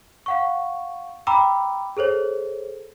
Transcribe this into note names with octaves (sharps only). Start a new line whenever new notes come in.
F5 F#5 C#6
G5 A#5 B5 D6 E6
G#4 A4 C5 C#5